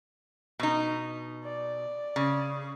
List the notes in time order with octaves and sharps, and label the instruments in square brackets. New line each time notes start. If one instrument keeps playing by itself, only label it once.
[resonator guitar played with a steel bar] B2 D#4
[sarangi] D5
[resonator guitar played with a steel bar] C#3